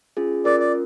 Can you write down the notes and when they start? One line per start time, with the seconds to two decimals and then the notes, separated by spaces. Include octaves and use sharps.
0.17 C#4 F4 G#4
0.45 C#4 F4 A#4 D5
0.60 D5